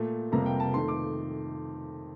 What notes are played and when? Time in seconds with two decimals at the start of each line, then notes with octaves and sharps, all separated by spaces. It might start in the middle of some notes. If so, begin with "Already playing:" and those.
Already playing: A#2 A3
0.32 F2 C3 G3 A#3 A#5
0.46 G5
0.60 A5
0.74 F2 D#3 A3 C6
0.88 D6